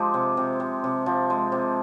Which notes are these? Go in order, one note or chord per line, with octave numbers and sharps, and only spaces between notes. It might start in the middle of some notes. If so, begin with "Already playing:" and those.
Already playing: F3 G#3 G4
C3
C3
C3
C3
F3
G#3
C3